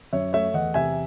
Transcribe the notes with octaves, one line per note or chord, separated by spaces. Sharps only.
F#2 C#5 E5
A3 C#5 E5
E2 D#5 F#5
C3 E5 G#5